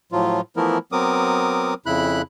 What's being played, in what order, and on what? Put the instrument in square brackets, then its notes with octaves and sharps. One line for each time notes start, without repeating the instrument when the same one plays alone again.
[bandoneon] A2 F3 F#3 F4
E3 F3 A3 B3 E4 A#4
F#3 B3 C4 A#4 D6 D#6
F2 C#3 E4 B5 F#6